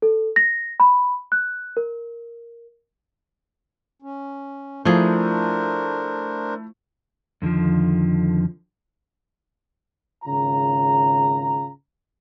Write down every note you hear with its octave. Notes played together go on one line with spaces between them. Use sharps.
A4
A#6
B5
F#6
A#4
C#4
F3 A3 D4 E4 G#4 A#4 C5
F2 D3 D#3 F3
G#1 C#3 F4 A#5